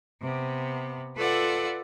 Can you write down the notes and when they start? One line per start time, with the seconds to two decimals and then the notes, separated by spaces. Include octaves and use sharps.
0.21 C3 B3
1.17 F4 A4 B4 D5 E5 F#5